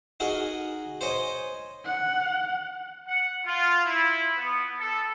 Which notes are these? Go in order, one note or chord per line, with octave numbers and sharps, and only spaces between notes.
D#4 F#4 G#4 A#4 D#5
C5 C#5 D#5 G#5
F#5
F#5
F4
E4
B3
A4